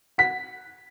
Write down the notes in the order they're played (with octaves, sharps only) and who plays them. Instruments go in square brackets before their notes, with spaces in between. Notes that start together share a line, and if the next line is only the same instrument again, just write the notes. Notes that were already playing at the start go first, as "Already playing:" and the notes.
[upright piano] F#5 B6